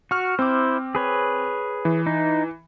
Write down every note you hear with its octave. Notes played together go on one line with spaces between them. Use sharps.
F#4 C#6 F6
C4 E4 C5 D6
G#4 B4 C#5
E3
D#4